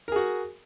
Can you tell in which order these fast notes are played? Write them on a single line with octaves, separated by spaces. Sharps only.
A#4 G#4 F#4